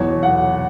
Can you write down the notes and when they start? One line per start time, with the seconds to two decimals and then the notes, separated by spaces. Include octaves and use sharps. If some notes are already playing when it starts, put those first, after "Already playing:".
Already playing: E2 B2 F#3 C#5
0.23 F#5